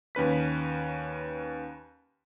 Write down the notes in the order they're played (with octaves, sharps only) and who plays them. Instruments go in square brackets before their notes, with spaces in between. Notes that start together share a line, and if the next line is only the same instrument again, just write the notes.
[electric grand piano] D#2 C#4 B4 B6